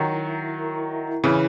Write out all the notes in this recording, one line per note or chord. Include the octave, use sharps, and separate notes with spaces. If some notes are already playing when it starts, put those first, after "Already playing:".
Already playing: D#3 F#3 A#4
E4
E5
E4
A#4
E4
E5
E4
C#3 E3 E4